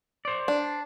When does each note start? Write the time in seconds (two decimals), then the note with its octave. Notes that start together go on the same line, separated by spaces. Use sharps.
0.25 C5 D5
0.48 D4